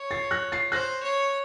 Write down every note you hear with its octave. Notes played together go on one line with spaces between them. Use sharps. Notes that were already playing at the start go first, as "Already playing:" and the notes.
Already playing: C#5
A6 C7
F#6 A#6
A6 C7
C5 F#6 A#6
C#5